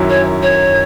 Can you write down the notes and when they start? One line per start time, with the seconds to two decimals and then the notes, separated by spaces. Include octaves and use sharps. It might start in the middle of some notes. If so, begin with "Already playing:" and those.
Already playing: F#2 D#3 F#3 C#4 E4
0.10 C#5
0.42 C#5